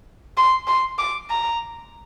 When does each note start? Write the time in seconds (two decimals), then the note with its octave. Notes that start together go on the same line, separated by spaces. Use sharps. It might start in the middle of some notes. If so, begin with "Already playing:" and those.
0.37 C6
0.67 C6
0.99 D6
1.30 A#5